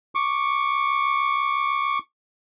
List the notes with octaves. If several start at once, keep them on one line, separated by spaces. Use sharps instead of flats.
C#6 D6